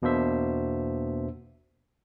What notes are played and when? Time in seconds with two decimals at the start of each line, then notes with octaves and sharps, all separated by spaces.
0.02 E2 B2 A#3 D4 C5 E5